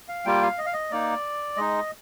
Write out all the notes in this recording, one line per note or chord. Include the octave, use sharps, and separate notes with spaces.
F5
G3 A#3 F4 G5
F5
D#5
F5
D#5
A#3 D#4 D5
G#3 D#4 D#5